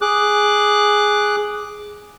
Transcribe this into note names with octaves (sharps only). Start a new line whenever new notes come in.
G#4 D6 F#6